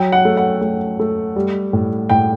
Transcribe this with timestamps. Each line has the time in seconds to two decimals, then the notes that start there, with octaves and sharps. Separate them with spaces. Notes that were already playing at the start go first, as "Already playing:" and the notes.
Already playing: F#3 G5
0.12 F#5
0.25 A3
0.37 F#5
0.61 A3
0.99 A3
1.36 G3
1.73 A2
2.09 A2 G5